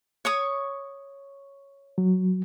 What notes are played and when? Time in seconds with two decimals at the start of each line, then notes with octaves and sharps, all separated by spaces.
0.25 C#5 C#6 D#6
1.98 F#3